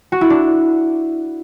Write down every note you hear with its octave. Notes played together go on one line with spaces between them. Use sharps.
F#4
E4
D4